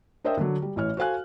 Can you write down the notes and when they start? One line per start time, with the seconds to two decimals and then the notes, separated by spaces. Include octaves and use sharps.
0.24 D4 A#4 C5 D#5 E5 G5
0.37 D3 F#3
0.62 G3
0.76 A1 E3 C#5 F6
0.97 F#4 A4 C5 F5 G#5 F#6